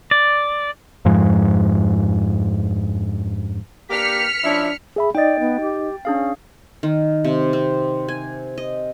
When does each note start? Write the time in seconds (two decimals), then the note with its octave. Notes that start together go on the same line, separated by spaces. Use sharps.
0.11 D5
1.05 F2 G#2 F3 G#3
3.90 A#3 D4 G4 F6 B6 C#7
4.44 F3 C#4 D4 E4
4.96 G#4 E5 B5
5.15 D#4 D5 D#5 G5 A6
5.40 B3
5.61 G4
6.05 C#4 D4 G#4 F5
6.83 D#3
7.24 C3
7.53 C4
8.08 G#5
8.58 D#5